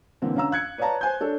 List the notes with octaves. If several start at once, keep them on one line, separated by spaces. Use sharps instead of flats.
D3 E3 A#3 C4
D3 C#4 F5 A#5 E6
F5 F#6 G#6 C#7
B4 C#5 D5 F5 A5 A#5
C5 G#5 G6
D4 A4 C#5